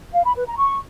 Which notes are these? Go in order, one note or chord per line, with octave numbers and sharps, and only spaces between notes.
F5
B5
B4
A#5
C#6